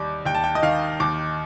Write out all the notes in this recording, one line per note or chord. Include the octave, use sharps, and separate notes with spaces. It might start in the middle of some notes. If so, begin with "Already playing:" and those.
Already playing: D#2 G3 D6
D#2 G5
A5
G5
D#5
D#3 F5
D#2 D6